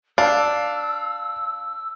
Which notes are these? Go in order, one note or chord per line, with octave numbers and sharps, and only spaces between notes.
D4 F5 E6